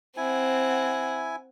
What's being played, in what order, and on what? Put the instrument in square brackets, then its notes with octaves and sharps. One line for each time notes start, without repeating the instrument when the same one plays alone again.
[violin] C4 F#5 [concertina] E4 G#5